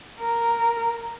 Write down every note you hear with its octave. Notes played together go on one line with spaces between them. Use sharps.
A#4